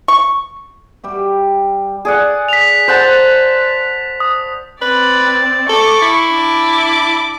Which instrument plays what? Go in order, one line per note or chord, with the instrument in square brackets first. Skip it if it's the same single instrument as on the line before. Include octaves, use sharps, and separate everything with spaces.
[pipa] C#6
[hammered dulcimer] G3 G4 E5
[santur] G#4 D5 F#5
[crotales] B6 F7
[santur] C5 F#5 A5
[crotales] D#6
[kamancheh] C4 D5 [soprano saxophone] B4
[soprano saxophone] A4 [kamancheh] C#6 D6
[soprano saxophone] E4
[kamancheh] D4 D6